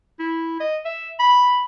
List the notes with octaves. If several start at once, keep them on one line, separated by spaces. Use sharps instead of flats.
E4
D#5
E5
B5